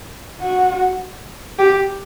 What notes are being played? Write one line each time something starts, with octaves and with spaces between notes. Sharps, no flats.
F#4
G4